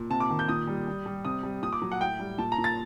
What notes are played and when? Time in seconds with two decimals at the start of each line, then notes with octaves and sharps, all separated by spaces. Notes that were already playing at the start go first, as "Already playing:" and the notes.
Already playing: A#2
0.10 C3 A5
0.20 D6
0.30 D#3
0.39 G6
0.49 A#2 D#6
0.67 G3
0.87 G3
1.06 G3
1.25 C3 D#6
1.43 G3
1.62 A#2 D#6
1.73 D6
1.82 F#3
1.92 F#5
2.00 A2 G5
2.20 G3
2.38 A#2 A5
2.52 A#5
2.58 A#2
2.64 A6